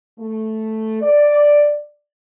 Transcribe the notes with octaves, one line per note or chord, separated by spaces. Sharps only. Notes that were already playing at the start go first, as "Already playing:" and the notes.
A3
D5